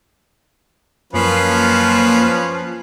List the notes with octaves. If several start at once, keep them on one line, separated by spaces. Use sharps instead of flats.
F#2 F3 A#3 C#4 B4 C7